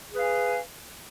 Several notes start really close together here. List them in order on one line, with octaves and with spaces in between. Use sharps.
G#4 B4 F5 G#5